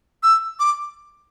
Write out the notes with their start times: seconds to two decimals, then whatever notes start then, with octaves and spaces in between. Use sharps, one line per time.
0.23 E6
0.60 D6